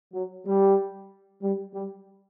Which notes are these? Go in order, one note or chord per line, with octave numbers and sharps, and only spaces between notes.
F#3
G3
G3
G3